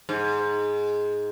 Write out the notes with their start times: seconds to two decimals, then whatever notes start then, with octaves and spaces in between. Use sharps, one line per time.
0.09 G#2